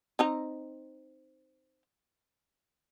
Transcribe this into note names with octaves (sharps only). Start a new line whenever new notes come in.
C4 D#4 A#5